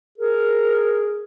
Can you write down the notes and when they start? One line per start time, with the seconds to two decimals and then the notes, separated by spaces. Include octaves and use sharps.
0.18 G#4 A#4